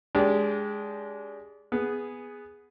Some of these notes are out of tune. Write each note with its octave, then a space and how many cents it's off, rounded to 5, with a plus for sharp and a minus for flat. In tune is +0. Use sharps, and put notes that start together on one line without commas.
G#3 +0 D4 -30 G4 +0
B3 +0 G#4 +0